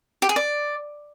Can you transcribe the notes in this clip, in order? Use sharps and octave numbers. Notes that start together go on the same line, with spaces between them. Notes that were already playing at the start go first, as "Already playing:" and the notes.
G4
G#4
D5